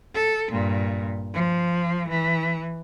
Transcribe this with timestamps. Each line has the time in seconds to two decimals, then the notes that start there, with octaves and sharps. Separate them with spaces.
0.15 A4
0.52 G2 A#2
1.34 F3
2.09 E3